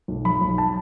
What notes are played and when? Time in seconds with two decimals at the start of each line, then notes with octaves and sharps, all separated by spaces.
0.08 B1
0.25 F#3 B5
0.41 B1
0.58 A5